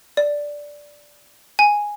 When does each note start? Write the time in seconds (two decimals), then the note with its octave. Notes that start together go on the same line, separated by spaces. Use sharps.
0.17 D5
1.59 G#5